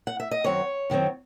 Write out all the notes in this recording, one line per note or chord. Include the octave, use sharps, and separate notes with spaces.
F#5
E5
D#5
F#2 D#3 F#3 C4 C#5
F#2 D#3 F#3 C4